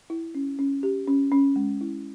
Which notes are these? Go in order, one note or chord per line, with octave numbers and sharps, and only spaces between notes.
E4
C#4
C#4
G4
C#4
C#4
G#3
E4